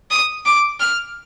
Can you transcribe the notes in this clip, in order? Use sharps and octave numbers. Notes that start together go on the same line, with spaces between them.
D#6
D6
F6